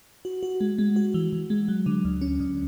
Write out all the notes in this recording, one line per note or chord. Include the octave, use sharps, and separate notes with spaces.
F#4
F#4
G#3
G#3
F#4
E3
E3
G#3
F#3
D3
D2
C#4
D2